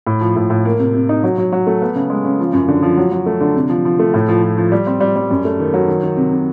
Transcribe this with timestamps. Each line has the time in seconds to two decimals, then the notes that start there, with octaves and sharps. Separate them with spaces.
0.07 A2
0.21 F3
0.36 A2
0.50 A2
0.65 A#3
0.79 C3
0.94 C3
1.09 D#4
1.24 F#3
1.38 F#3
1.52 F#3
1.67 A3
1.82 B3
1.96 C#3
2.10 G#3
2.25 C#3
2.40 F3
2.53 F#2
2.68 D3
2.82 F3
2.97 F#3
3.12 F#3
3.26 A3
3.41 D3
3.56 C3
3.70 F3
3.85 F3
3.99 A3
4.14 A2
4.28 F3
4.42 F3
4.58 F3
4.72 G3
4.87 C4
5.00 G3
5.16 G3
5.31 F#2
5.45 A3
5.60 D#3
5.74 F#3
5.88 D#3
6.03 D#3
6.17 C3
6.32 C3